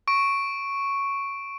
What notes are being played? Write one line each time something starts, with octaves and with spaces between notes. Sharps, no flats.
C#6 D7